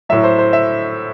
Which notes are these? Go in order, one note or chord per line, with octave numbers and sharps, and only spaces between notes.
A2 F#3 E5
C5
C5
E5